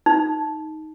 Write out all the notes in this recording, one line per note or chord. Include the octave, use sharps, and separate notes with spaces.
D#4